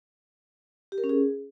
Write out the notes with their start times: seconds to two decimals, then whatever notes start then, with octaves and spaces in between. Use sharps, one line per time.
0.92 G4
0.98 A#4
1.04 C#4
1.09 G#4